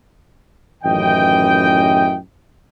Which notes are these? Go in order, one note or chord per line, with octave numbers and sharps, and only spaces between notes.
A1 F#2 D#3 E3 D#5 G5